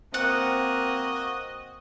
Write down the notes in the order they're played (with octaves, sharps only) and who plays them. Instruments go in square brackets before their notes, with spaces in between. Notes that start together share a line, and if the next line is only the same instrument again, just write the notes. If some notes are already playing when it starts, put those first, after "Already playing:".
[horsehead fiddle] A#3 [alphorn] C4 [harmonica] F#4 D#5 [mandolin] F#5